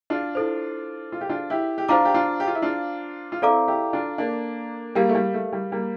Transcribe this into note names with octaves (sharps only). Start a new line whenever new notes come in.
D4 F4
E4 A4 C5
F4
G4
D4 F4
E4 G4
G4
D4 F4 C5 F5 A#5 D6
G4
D4 F4
G4
F4
E4
D4 F4
F4
C4 E4 A4 D5 F5 A#5 D6
E4 G4
D4 F4
A#3 D4
G3 A#3 G4 A#4 F5
A3
G3
A3
G3
G3 A#3